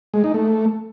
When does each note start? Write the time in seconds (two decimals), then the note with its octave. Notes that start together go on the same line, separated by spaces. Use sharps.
0.14 G#3
0.24 D#4
0.34 A3